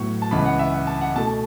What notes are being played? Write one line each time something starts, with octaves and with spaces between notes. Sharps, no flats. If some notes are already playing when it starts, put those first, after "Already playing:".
Already playing: A2 F#3 B3 C#6
A5
C#2 C#3 E3 B3 B5
F#5
E5
F#5
A5
F#5
B2 A3 A5
A5